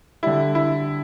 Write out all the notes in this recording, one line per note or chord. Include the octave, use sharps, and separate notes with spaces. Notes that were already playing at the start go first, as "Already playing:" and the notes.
D3 G3 E4
E4